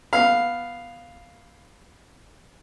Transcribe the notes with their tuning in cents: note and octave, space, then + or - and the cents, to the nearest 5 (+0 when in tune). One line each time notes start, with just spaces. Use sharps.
B3 +0 F5 +0